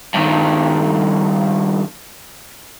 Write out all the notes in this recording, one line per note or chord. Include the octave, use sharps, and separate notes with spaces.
G2 D#3